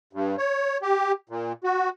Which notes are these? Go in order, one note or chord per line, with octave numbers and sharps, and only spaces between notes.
G2
C#5
G4
A#2
F#4